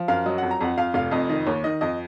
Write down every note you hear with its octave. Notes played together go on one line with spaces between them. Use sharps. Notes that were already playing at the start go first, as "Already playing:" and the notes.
Already playing: F3
F#2 F5
F#3 D#5
F2 F#5
A#5
F2 F#5
F2 F5
F1 F5
F2 D#5
D#3 D#5
D#2 C#5
D#3 D#5
F2 D#5